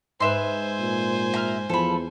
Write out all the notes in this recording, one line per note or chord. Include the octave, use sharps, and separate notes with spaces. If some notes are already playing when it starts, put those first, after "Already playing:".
G#2 B4 C5 E5 G#5 C6
A#2
E5 A#5 F6
E2 F3 A4 B5